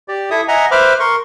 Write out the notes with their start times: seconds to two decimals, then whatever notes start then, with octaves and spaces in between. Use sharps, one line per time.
0.08 G4 D5
0.30 E4 A4 E5 D#6
0.48 D#5 E5 F#5 G#5 A#5
0.71 B4 C5 E5 B5 D6 F6
1.00 A#4 C6 C#6